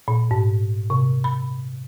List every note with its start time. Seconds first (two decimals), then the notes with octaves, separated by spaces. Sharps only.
0.08 A#2
0.31 G#2
0.90 C3
1.24 B5